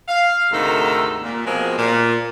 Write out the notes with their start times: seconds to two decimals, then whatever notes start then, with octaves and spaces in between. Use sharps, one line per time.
0.08 F5
0.52 D2 G#2 C3 D#3 A4
1.23 A#2
1.45 B2 F3 G#3 A#3 C4
1.78 A#2